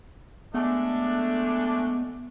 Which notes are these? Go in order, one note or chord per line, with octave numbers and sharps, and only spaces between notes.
G#3 A3 B3 D4